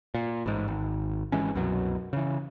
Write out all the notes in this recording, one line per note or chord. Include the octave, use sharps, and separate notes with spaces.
A#2
A1 G#2
G#1
G#1 E3 G#3 C#4
C2 F#2 B2 F#3
C#3 E3